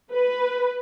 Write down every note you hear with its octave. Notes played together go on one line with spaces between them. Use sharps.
B4